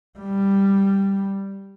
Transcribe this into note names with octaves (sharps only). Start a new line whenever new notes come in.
G3